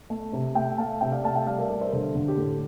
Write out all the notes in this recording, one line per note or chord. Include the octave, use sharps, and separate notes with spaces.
A3
C3
A3 E5 G5
A3 F5 A5
C3 E5 G5
D5 F5
A3 F5 A5
E5 G5
G3 D5 F5
A#4 D5
G3 A#4 D5
C5 E5
A#4
D3 A4 C5
D3
G4
A2 A4